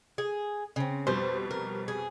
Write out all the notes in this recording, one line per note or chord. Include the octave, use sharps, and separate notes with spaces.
G#4
C#3 C4
F2 B2 G3 C5
A#4
G#4